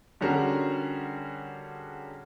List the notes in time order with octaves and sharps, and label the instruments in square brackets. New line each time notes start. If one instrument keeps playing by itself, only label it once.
[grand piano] D3 G3 C#4 F#4 G#4 A#4